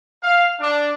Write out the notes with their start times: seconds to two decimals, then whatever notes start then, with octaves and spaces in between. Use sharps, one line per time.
0.23 F5
0.60 D4